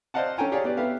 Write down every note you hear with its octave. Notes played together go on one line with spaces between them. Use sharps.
C5 D5 D#5 F5 F#5 A5
C#4 A4 C#5 G5 G#5 A#5
G4 G#4 C#5 D5 F5
B3 G4 D5
B3 G4 A4 B4 E5 F5